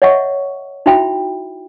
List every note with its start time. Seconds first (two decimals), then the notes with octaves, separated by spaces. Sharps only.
0.02 C#5 D#5 E5 F#5 C#6
0.86 D#4 E4 F#4 E5 G5 B5